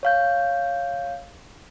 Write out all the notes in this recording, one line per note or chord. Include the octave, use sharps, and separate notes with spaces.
C#5 F5 G6